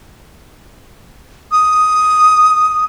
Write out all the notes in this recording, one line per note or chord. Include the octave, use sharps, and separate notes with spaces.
D#6